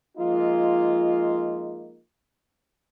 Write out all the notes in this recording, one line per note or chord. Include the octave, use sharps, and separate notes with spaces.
F3 G#3 A#3 D#4 F4